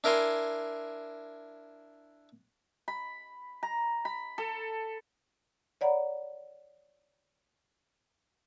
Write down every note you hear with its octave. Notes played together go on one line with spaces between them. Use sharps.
D4 E4 A#4 E5 G#5 C6
B5
A#5
B5
A4
C#5 D5 F#5 A#5 B5